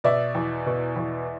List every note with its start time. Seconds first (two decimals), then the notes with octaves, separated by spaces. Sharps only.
0.04 B2 D5 E5
0.35 E2
0.66 B2
0.96 E2